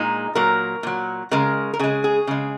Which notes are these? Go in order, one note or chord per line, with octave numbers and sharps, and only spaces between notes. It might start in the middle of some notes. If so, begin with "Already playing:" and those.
Already playing: A#2 G#3 D#4
A#2 F#3 A#4
A#2 F#3
C#3 G#3 A#4
A#4
C#3 G#3 G#4
G#4
C#3 G#3